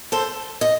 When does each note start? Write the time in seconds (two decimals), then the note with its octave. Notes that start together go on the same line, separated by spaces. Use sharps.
0.12 A4 C5
0.61 D#5